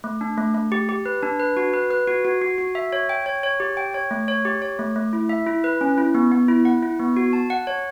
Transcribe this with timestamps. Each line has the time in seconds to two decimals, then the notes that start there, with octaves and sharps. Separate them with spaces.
0.04 A3
0.21 D4
0.38 A3
0.55 A3
0.72 G4
0.89 G4
1.06 B4
1.23 D4
1.40 B4
1.57 F#4
1.73 B4
1.91 B4
2.08 F#4
2.25 F#4
2.41 F#4
2.58 F#4
2.75 E5
2.93 C#5
3.09 G5
3.26 C#5
3.43 C#5
3.60 G4
3.77 G5
3.94 C#5
4.11 A3
4.28 C#5
4.45 G4
4.62 C#5
4.79 A3
4.96 A3
5.13 E4
5.29 E5
5.47 E4
5.64 B4
5.81 C#4
5.98 E4
6.15 B3
6.32 B3
6.48 E4
6.65 F#5
6.82 E4
7.00 B3
7.16 F#4
7.33 A5
7.50 F#5
7.67 C#5